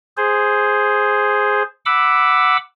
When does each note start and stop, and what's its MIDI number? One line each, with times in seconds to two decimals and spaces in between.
0.17 1.63 68
0.17 1.63 72
1.86 2.57 78
1.86 2.57 83
1.86 2.57 86
1.86 2.57 88